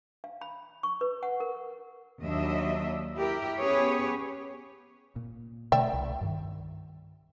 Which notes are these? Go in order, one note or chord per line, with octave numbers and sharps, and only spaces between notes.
F5
B5
C#6
B4
F#5
A#4
D#2 F#3 D4 D#5 E5
E4 G4 A#4
B3 C#4 G4 G#4 B4 C#5
A#2
B2 D3 A3 D5 E5 G5
C2
G2 D#3